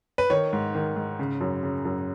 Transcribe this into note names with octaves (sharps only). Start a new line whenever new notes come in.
B4
D#3 C#5
G#2
D#3
G#2
C#3
F#2
C#3
F#2